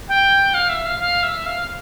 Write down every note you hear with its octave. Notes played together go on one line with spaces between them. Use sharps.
G5
F5
E5
F5
F5
E5
F5